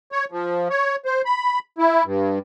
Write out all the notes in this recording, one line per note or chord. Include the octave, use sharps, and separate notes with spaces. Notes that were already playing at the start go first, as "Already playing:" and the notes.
C#5
F3
C#5
C5
B5
E4
G2